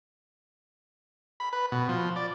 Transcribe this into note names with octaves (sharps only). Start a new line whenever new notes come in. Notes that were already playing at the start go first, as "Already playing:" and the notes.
B5
B4
B2
F3
D5